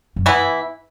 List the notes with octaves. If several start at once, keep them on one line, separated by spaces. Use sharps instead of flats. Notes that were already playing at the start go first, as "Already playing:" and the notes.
F#2
E3 B3 E4